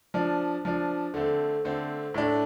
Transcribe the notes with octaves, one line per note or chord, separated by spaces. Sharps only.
F3 D4
F3 D4
D3 A3 C4
D3 A3 C4
A2 A3 D4